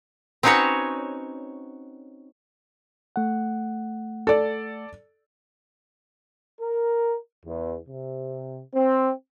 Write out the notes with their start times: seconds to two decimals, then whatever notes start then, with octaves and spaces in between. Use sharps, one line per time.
0.43 C4 C#4 D#4 F#4 B4 C#5
3.16 A3 F#5
4.27 A4 D5
6.61 A#4
7.45 E2
7.87 C3
8.74 C4